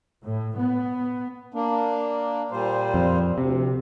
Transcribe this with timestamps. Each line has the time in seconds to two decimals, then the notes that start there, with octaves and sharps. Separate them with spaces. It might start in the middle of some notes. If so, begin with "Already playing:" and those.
0.24 A2
0.57 B3
1.54 A#3 D4
2.51 A#2 G3 C5
2.94 F2
3.38 D2 C3